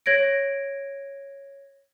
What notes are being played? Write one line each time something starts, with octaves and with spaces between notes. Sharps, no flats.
C#5 G#6 A#6 D7